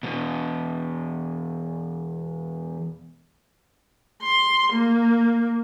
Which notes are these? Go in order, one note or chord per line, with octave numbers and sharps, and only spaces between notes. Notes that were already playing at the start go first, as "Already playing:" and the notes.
E2 B2
C6
A#3